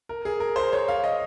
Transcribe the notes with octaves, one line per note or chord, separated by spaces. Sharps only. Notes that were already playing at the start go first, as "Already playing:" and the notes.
A#4
G#4
A#4
C5
C#5
F5
D#5